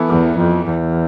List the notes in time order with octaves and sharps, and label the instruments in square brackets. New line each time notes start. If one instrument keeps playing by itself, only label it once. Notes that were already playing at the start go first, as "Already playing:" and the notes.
Already playing: [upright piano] E3 B3 E4 A4
[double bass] E2
F2
E2